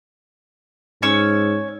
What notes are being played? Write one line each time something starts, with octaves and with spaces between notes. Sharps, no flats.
G#2 C#4 C#5 E6